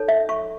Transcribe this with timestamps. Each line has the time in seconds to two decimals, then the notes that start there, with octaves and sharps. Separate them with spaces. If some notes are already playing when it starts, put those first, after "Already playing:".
Already playing: D#4 A4 C#5
0.08 E5
0.29 C#6